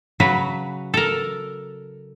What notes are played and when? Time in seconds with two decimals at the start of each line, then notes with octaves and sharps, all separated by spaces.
0.20 C#3 F#3 F#4 B4
0.94 A4 A#4